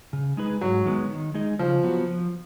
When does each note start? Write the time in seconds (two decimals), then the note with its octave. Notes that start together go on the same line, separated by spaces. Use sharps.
0.13 C#3
0.37 G#3 D#4 G#4 B4
0.61 G#2 F#3
0.86 D#3 G#3 B3
1.10 D#3
1.34 G#3 D#4 G#4 D#5
1.59 C#3 F3
1.83 F#3 B3 F#4
2.07 F3